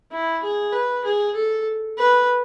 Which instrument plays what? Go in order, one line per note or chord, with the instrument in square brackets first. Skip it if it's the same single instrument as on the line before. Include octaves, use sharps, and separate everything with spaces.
[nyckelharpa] E4
G#4
B4
G#4
A4
B4